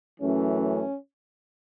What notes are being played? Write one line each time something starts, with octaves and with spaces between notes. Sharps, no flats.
F#2 E3 A3 C#4
C#4